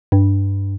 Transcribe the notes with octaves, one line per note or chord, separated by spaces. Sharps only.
G2